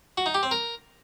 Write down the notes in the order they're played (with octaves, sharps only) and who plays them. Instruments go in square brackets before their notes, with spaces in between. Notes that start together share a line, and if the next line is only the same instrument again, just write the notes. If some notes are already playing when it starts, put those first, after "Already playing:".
[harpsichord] F#4
D#4
G4
C4
A#4